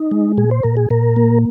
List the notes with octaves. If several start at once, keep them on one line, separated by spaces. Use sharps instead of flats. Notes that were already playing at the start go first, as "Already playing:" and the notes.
Already playing: D#4
G#3
A#2 G#4
C5
A#2 A#4
G#4
A#2 A#4
A#3